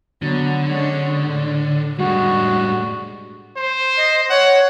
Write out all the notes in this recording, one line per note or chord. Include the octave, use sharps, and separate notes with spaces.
D3 F#3 B3
G#3 C#4 D4
A2 D4
A2 G3 G#3 D4 F#4
C5
D#5
C#5 F#5